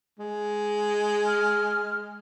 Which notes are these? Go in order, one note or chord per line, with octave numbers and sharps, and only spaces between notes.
G#3
F6